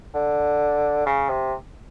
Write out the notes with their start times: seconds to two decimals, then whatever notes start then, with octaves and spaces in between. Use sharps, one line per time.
0.15 D3
1.06 C#3
1.29 C3